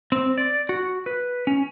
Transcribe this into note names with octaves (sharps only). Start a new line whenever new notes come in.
C4
D5
F#4
B4
C#4